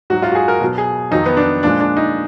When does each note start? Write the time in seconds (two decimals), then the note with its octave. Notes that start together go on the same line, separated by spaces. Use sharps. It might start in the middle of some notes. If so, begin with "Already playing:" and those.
0.10 G#2 F#3 F#4
0.22 F4
0.32 F#4
0.35 G#4
0.48 A#4
0.61 B2 F#3
0.78 G#4
1.11 F2 D#3 F#3 D#4
1.26 B3
1.37 D4
1.63 A#2 F3 G#3 D4
1.80 D4
1.97 D#4